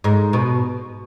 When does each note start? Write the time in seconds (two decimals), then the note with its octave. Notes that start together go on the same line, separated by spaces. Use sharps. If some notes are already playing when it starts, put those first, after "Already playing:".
0.04 G#2
0.33 B2